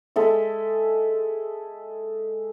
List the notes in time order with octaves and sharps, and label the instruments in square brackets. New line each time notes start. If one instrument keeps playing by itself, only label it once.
[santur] G#3 A4 E5